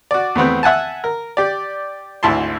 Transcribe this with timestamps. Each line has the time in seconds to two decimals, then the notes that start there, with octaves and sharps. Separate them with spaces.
0.11 F#4 D5
0.35 E2 A3 B3 C4
0.63 E5 F#5 G#5 A5
1.04 A#4
1.37 G4 D5
2.23 G#1 D2 E4 A5 C6